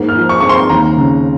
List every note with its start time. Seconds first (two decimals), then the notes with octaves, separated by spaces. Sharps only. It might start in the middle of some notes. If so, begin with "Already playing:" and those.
Already playing: G#2 A#3
0.09 F6
0.15 F3
0.29 C#6
0.40 C4 C#6
0.49 C6
0.69 D#2 A#5
0.96 C#3